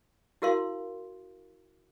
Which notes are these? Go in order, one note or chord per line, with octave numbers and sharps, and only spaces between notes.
E4 F#4 A#4 F5 C6